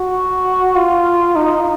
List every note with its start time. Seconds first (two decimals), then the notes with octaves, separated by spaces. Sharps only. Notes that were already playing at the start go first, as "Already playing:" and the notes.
Already playing: F#4
0.75 F4
1.36 D#4